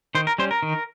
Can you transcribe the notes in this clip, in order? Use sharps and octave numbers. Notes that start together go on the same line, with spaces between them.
D#3 C5
A#4
G3 C#4 C5
A#4
D#3